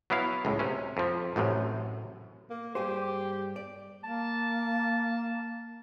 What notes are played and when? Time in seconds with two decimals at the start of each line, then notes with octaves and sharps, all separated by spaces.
0.10 F#3 B3 E4 F5
0.45 C#2 A2
0.59 C3 C#4
0.97 F2 F3
1.36 A1 F#2 A2 C3
2.50 A#3
2.75 G2 G4 G#4 C5
3.56 D5
4.04 A#3 A5